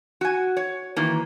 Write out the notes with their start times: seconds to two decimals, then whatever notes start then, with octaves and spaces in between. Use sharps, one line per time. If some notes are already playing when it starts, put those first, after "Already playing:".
0.21 F#4 G#5
0.57 C#5
0.96 D#3 E3 A#3